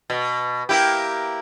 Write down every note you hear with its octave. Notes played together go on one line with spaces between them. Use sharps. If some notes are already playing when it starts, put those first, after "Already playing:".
B2
A#3 E4 G4